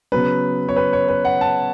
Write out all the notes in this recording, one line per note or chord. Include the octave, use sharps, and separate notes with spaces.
C#3 F#3 B3 B4
C#5
B4
C#5
B4
F#5
A5